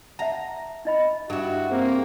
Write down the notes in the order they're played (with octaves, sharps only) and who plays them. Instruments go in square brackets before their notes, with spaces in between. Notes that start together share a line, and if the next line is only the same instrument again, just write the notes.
[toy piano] E5 F#5 A5 [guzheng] A#5
[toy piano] D#4 D#5 B5
[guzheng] G2 E4 [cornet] F#4
[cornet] A#3 [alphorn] C4 [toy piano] G#4